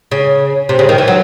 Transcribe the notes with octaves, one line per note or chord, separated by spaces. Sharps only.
C#3
C3
C#3
D#3
E3
F#3